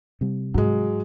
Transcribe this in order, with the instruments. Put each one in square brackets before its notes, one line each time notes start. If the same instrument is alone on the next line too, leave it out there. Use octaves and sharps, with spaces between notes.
[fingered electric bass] C3 G3
[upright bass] G#2 [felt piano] F#3 G#3